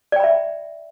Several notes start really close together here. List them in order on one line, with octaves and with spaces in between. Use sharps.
D5 G5 B5 E5